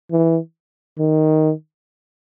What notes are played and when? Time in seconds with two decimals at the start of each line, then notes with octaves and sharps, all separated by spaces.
0.11 E3
0.99 D#3